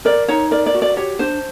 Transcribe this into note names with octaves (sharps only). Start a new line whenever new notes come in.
A#4 D5
D#4 C#5
A#4 D5
D5
F#4
D5
G4 C#5
D4 C5